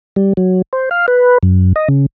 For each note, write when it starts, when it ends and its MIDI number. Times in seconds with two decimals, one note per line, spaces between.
0.16 0.33 55
0.37 0.62 54
0.73 0.89 72
0.91 1.06 77
1.08 1.38 71
1.43 1.73 42
1.76 1.88 75
1.88 2.06 49